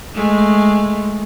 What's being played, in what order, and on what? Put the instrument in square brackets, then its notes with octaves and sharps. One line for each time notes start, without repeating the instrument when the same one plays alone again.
[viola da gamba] G#3 A3